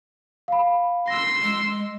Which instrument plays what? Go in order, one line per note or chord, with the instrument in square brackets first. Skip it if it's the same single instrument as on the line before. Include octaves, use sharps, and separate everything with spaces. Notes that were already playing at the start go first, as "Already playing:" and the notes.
[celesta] F5 B5
[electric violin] C6 E6 [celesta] A#6
[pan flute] G#3